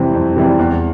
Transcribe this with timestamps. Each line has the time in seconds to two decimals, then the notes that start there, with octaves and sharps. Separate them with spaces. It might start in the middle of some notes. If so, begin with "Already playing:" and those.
Already playing: F2 C3 E3 G3 C4
0.14 F2
0.36 C3 E3 G3 C4
0.59 E2